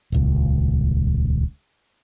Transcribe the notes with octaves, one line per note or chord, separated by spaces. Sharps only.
D#1 C#2